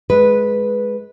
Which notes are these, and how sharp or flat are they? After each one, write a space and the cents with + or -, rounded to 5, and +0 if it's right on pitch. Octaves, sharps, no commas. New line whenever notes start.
G#3 +15 B4 -5